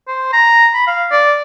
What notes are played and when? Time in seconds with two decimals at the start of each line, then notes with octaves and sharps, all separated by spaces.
0.08 C5
0.33 A#5
0.74 B5
0.87 F5
1.11 D5